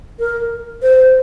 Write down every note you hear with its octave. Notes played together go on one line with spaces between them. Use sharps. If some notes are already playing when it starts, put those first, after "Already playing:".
A#4
C5